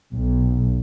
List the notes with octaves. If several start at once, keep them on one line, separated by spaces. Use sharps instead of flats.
B1